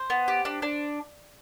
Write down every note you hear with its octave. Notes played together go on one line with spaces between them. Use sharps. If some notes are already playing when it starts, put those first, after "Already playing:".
Already playing: C5
B3
G4
D4
D4